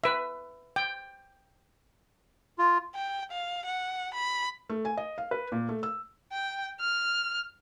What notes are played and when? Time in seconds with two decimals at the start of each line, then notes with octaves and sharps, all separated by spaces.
0.04 B4 E5
0.76 G5
2.58 F4
2.95 G5
3.31 F5
3.65 F#5
4.14 B5
4.70 A3
4.85 G#5
4.97 D#5
5.18 F5
5.31 B4
5.52 A#2
5.69 A3
5.83 E6
6.32 G5
6.80 F6